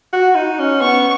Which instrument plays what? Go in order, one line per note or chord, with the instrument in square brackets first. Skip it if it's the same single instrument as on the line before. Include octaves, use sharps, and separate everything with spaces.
[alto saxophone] F#4
D#4
C#4
[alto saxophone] B3 [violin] C#6